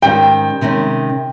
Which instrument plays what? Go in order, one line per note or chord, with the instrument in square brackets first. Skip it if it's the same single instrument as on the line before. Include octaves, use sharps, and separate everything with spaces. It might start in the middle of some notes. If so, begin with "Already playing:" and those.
[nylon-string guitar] G#2 D#3 G3 C#4 [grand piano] G5
[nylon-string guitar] C3 D#3 G#3 C#4